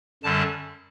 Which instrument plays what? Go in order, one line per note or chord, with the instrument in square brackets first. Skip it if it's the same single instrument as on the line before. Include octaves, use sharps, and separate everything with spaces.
[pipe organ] F#2 D3 G3 A5